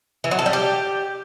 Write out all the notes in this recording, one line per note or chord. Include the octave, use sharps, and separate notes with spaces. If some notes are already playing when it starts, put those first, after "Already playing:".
E3
F#3
A4
G3
G4